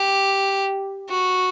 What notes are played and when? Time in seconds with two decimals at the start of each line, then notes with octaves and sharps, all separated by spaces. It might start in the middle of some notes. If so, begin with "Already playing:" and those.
Already playing: G4
1.09 F#4